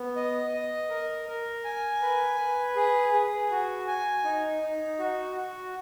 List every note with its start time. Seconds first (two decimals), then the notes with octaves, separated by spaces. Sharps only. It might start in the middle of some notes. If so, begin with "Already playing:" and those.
Already playing: B3
0.16 D#5
0.53 D#5
0.90 A#4
1.28 A#4
1.64 G#5
2.01 B4
2.39 B4
2.76 G#4
3.14 G#4
3.51 F#4
3.87 G#5
4.24 D#4
4.62 D#4
4.99 F#4
5.36 F#4